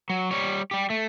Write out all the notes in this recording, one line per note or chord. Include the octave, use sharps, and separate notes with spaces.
F#3
G3 C#5
G3 G4
A3